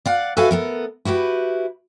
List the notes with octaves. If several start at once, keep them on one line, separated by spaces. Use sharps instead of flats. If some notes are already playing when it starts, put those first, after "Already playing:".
D5 F5 F#5
F#4 A4 B4 E5 F5 G#5
B3 A4 A#4
E4 F#4 G4 B4